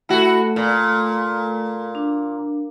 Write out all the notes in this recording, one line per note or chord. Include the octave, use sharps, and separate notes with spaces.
A3 E4 F#4 A4
A#2
D4